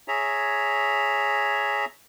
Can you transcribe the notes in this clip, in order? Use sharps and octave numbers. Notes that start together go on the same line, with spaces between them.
G#4 C#5 E5 A#5